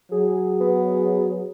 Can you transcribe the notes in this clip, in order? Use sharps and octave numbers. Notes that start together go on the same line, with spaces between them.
F#3 G#4
B3